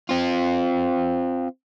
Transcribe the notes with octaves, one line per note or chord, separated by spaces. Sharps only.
C4 F4